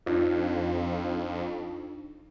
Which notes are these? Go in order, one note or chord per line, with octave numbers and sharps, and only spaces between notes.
F2 D4 D#4 F4